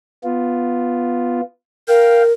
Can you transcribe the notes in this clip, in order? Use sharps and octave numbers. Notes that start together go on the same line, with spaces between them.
B3 F4
A#4 F5 G5